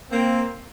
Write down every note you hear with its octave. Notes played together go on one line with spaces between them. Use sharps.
A#3 C4